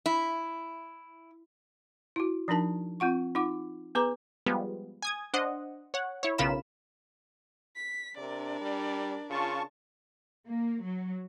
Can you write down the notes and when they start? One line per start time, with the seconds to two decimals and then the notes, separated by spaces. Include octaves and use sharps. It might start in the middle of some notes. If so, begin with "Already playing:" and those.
0.06 E4
2.16 E4 F#4
2.48 F3 D4 D#4 A#4 A5
3.00 C4 F4 F#5 C#6
3.35 D#4 F4 F#5 D6
3.95 B3 G#4 B4 A#5 D6
4.46 F3 G3 G#3 B3
5.02 G#5 D#6 G#6
5.34 D4 C5 D#5 F#5
5.94 C#5 F#5
6.23 E4 C#5
6.38 B1 C#3 F4 A#4 B5 E7
7.76 B6
8.17 C3 D4 A#4 D5
8.61 G3
9.30 C#3 F4 A5 C#6
10.47 A#3
10.84 F#3